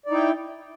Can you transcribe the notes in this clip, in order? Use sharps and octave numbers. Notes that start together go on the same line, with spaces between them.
D#4 E4 D5 G5